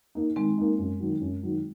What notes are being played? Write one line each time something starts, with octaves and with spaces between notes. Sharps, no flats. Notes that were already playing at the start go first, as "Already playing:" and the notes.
A#3 D#4
D#3 G#3 C4
A#3 D#4
F#2
D#3 F#3
F#2
D#3 F#3